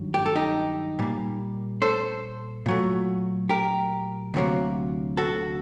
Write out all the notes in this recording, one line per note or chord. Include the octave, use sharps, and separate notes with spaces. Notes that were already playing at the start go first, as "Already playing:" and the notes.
Already playing: G2 D#3 F#3
G4
A4
D#4 G4
A#2 G3 A#3
A4 C5
A#2 F#3 A3
G4 A#4
D2 C3 F#3 A#3
F#4 A4